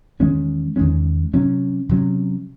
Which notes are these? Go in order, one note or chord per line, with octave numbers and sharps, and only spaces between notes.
E2 D#3 G#3 C#4
E2 D#3 G#3 C#4
C3 F#3 C#4
C3 F#3 C#4